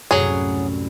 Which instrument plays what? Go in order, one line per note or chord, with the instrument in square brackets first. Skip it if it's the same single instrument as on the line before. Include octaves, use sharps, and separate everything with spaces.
[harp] C2 F#2 A2 [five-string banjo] F#3 G#4